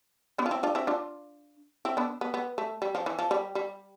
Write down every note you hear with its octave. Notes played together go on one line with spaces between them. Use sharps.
B3 D4
F4
C4 E4
D4 F4
C4 E4
D4 F4
C4 E4
B3 D4
B3
B3
A3
G3
F3
E3
F3
G3
G3